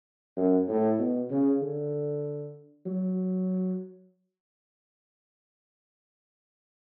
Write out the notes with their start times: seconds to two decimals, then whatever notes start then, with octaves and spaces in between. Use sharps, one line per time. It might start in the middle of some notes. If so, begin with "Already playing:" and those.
0.36 F#2
0.68 A2
0.99 B2
1.31 C#3
1.62 D3
2.86 F#3